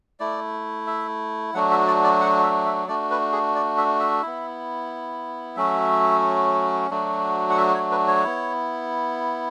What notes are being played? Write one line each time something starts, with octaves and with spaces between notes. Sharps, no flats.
A3 E4 D5
E5
F#3 A3 D4 F#4 F#5
E5
D5
D5
F#5
E5
E5
A3 D4 F#4 D5
B4
G#4
D5
E5
E5
B3 E4
F#3 A3 C#4 F#4 E5
F#3 A3 D4 F#4
F#5
E5
C#5
B4
C#5
B3 E4